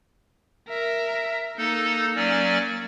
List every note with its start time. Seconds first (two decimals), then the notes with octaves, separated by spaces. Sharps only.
0.69 A#4 E5
1.57 A#3 D#4 A4
2.16 F#3 C#4 D5